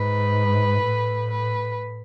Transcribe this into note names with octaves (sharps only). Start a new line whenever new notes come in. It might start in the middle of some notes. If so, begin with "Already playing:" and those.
Already playing: G#2 B4
A2
B4